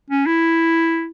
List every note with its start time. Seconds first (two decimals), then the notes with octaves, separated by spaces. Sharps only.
0.10 C#4
0.26 E4